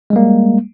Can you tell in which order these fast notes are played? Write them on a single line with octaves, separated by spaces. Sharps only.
G#3 G3 A#3